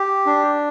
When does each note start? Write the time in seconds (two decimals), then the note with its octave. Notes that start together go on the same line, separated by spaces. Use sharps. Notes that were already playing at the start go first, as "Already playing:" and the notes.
Already playing: G4
0.26 D4